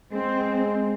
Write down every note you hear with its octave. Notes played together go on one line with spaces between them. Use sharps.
G#3 C4